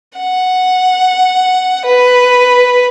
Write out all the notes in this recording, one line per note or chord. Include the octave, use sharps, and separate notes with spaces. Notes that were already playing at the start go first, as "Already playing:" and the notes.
F#5
B4